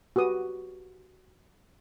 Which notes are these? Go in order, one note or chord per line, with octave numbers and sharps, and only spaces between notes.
F#4 G4 B4 D#6